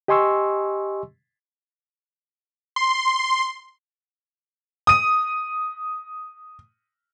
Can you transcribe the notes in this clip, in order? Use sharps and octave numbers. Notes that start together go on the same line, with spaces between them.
G4 D#5 G#5 C6 C#6 E6
C6
D#6 D#7